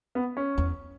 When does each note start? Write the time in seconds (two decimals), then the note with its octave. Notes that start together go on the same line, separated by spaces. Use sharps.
0.15 B3
0.37 C#4
0.58 E2